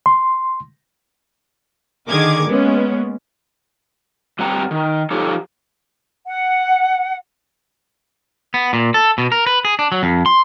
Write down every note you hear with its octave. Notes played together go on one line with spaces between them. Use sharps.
C6
D3 D#3 G#4 A#4 D6 G#6
G#3 A#3 B3 C#4
G2 G3 C4 F#5 A#5
D#3
F3 D#4 G4 A4 C#5
F#5
B3
A#2
A4
B2
A#4
B4
G#4
D4
F#3
F2
C6